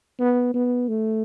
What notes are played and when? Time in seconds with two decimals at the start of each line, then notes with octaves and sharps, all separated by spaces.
0.19 B3
0.54 B3
0.89 A3